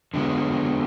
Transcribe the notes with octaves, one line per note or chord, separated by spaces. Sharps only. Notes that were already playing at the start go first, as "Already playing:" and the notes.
D3 G#3 B3